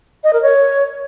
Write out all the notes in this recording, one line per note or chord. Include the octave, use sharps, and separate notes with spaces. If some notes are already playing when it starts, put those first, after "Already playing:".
D#5
A#4
C#5